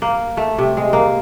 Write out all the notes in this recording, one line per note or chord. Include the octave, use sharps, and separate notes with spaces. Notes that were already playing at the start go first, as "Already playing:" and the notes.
A#3
A3
C3
G#3
A#3